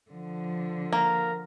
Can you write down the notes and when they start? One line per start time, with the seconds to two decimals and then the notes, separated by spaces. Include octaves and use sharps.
0.11 D3 F3
0.93 A#3 A#4